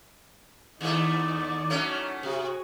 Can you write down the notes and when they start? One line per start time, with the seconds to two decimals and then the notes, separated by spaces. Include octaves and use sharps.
0.81 D#2 A3 D#4 D5
1.70 F#3 A3 C#4
2.23 C3 F#4 G#4